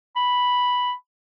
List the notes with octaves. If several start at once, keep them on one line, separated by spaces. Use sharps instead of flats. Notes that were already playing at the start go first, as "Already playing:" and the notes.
B5